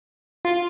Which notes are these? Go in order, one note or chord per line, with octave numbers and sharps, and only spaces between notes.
F4